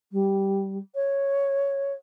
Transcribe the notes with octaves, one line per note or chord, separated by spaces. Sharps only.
G3
C#5